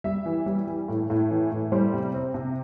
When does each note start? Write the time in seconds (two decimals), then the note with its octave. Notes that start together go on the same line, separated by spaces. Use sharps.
0.04 G3 E5
0.26 E3
0.46 G3
0.68 E3
0.88 A2
1.10 A2
1.31 E3
1.52 A2
1.72 G3 C5
1.94 C3
2.14 C4
2.34 C3